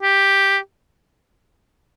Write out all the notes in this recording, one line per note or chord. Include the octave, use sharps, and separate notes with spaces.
G4